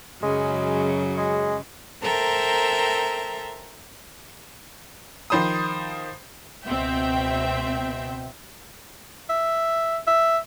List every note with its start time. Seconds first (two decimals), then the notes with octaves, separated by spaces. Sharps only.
0.23 F#2 C#3 F#3 G#3
1.17 G#3
2.03 A4 A#4 C5 E5 G5 A#5
5.30 D#3 F3 C5 B5 D#6
6.65 C#2 B2 C4 E5 G5
9.29 E5
10.07 E5